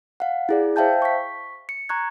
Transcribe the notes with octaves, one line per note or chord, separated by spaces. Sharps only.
F5 F#5
E4 G#4 D5
C5 E5 F5 G5 A5 G6
C#6 B6
C#7
A#5 C#6 F#6 G#6